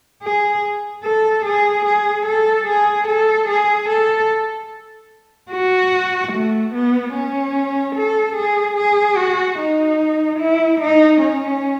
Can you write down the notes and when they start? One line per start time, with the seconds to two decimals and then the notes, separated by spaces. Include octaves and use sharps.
0.23 G#4
1.04 A4
1.46 G#4
1.86 G#4
2.26 A4
2.67 G#4
3.08 A4
3.48 G#4
3.89 A4
5.52 F#4
6.33 A3
6.74 B3
7.15 C#4
7.96 A4
8.36 G#4
8.78 G#4
9.17 F#4
9.59 D#4
10.39 E4
10.80 D#4
11.21 C#4